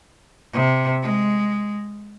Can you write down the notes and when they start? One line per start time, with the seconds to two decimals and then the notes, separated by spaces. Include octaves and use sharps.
0.54 C3
1.03 G#3